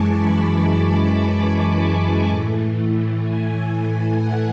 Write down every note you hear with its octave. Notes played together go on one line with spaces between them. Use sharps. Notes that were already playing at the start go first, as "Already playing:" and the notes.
Already playing: F#2 E3 G#3 G#5 A5 C#6 D6
B5
A5
A5
A2 E3 A3
G#5
F#5